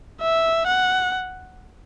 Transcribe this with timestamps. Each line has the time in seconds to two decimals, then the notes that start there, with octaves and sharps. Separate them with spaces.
0.21 E5
0.67 F#5